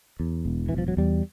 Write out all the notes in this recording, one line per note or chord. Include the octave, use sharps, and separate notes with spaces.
E2
E1
B2 E3
F3
F#3
E2 G3